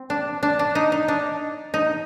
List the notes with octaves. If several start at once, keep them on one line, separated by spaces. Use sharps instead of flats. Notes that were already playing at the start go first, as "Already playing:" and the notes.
Already playing: C4
D4
D4
D4
D#4
D#4
D4
D#4